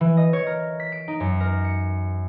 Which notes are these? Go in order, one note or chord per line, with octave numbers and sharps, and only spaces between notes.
E3
D#5
C#5
A#4
B6
D7
D#4
F#2
A#4
C#7